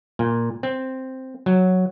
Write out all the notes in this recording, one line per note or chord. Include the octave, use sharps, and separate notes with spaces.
A#2
C4
F#3